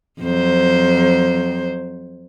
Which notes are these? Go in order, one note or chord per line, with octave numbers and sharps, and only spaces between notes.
F2 F#3 C5